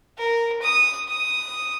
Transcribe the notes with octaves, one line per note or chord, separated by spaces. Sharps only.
A#4
D#6
D#6